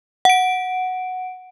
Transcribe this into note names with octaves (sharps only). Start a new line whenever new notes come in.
F#5 D7